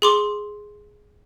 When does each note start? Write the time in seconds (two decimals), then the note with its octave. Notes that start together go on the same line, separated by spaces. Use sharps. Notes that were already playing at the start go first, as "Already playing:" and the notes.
0.02 G#4 C6 D6